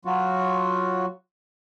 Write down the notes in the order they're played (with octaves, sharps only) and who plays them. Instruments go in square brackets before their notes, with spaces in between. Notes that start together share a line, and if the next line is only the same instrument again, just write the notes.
[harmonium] F#3 F4 F#4